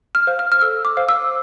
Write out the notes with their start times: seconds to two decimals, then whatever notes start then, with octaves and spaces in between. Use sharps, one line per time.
0.15 F6
0.27 C5 F5
0.39 F6
0.52 F6
0.61 A4 E6
0.85 D6
0.97 C5 F5
1.09 E6